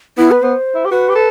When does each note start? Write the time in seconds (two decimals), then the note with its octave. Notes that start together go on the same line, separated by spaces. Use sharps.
0.18 B3 E4
0.31 B4
0.43 B3 C5
0.75 E4
0.85 G4
0.90 F#4 B4
1.09 G4
1.15 A4